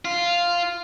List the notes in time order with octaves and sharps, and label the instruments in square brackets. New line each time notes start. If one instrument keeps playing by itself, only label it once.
[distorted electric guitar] F4